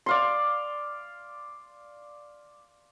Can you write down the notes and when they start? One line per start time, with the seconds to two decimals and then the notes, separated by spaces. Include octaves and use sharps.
0.06 D5 F5 C6